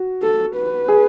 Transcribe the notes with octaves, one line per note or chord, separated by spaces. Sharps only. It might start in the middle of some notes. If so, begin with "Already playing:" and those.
Already playing: F#4
A4
B4
G#4